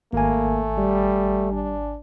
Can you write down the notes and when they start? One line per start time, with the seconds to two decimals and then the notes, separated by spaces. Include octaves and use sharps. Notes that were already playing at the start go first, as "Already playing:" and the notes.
0.13 G#1 A3 A#3 G#5
0.78 G3
1.52 D4